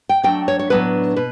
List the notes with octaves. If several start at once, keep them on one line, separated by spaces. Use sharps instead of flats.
G5
F#3 A3 D4 G5
C#5
C#5
A2 F#3 B3 D4 B4
B2 B4